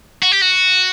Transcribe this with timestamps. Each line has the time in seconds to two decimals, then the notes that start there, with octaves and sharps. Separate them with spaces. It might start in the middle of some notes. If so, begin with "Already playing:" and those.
0.23 F#4
0.32 G4
0.41 F#4